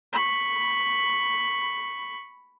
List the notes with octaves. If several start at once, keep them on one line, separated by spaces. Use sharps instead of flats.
B5 C#6